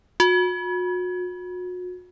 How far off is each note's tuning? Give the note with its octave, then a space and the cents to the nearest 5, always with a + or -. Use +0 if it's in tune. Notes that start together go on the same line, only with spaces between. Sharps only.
F#4 -40